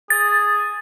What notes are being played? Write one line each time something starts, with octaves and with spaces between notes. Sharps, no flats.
G#4 A6